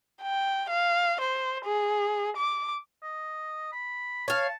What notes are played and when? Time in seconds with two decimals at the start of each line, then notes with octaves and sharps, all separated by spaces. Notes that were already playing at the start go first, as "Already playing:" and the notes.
0.22 G5
0.69 F5
1.20 C5
1.65 G#4
2.36 D6
3.03 D#5
3.72 B5
4.28 C#5 F5 A5